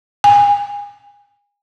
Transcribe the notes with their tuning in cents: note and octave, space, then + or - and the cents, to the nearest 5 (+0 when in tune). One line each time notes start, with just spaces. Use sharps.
G#5 -30